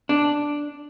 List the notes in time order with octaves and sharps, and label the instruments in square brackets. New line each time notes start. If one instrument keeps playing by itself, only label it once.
[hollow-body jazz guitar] D4